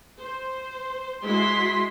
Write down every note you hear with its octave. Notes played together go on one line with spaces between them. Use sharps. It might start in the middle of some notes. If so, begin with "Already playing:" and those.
C5
G#3 E4 F#4 C6 B6